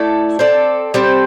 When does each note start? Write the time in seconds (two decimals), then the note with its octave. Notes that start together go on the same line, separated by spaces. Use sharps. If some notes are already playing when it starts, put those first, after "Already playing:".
Already playing: A3 E4 A4 D5
0.39 C4 A4 D5
0.94 G3 C4 A4 C5